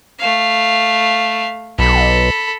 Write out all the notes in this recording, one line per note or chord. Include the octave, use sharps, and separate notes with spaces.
A3 F5
B1 A4 B5